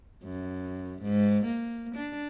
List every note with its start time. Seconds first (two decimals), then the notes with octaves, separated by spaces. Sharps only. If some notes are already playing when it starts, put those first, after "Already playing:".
0.23 F#2
1.03 G#2
1.45 A#3
1.96 D4